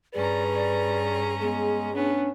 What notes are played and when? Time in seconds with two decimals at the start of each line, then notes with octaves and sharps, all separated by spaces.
0.14 G2 C#4 G#4 B4 D5 A#5
0.54 D5
1.41 G#3 B3 G#4
1.94 B3 C#4 D4